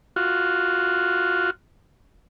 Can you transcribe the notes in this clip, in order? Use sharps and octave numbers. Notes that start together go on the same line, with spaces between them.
F4 F#4